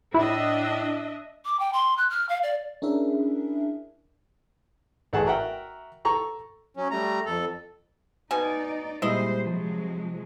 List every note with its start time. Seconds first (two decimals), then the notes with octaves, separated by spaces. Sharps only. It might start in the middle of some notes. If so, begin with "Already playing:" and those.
0.14 A2 D4 E4 D#5 E5
1.45 D6
1.59 G5
1.73 C6
1.97 F#6
2.10 F6
2.29 F5
2.43 D5
2.82 C#4 D4 E4 G#4 A#4 E5
5.13 A1 A3 G#4 F#5 A5
5.26 F#4 A#4 E5 F#5 G5
6.05 A4 A#5 C#6
6.77 F#3 C#4
6.91 G3 A3 A#5
7.26 F2 A4
8.31 B2 D#4 D5 G#5
9.02 A#2 G3 G#3 E4 C5 D#5
9.46 C3 F3 F#3 G#3